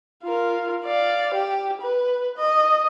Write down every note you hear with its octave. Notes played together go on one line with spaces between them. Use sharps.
F4 A#4
D5 F5
G4
B4
D#5